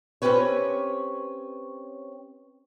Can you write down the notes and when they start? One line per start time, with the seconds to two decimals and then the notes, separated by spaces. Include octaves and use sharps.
0.22 C4 C#4 F4 G4 B4 C#5